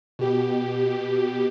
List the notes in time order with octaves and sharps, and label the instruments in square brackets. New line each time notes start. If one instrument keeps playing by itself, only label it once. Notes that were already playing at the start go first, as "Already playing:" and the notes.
[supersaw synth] B2 G4